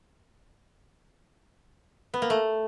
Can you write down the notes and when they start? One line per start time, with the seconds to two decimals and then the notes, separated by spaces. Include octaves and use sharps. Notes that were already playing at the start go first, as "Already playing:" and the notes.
2.14 B3
2.22 A#3
2.30 A3